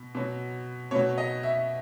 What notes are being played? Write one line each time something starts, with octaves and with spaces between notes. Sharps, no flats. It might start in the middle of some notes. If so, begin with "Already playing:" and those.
Already playing: B2
B2 F#3
B2 F#3 C#5
D#5
E5